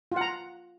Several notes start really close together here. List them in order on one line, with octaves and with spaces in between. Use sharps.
F4 F#5 A#5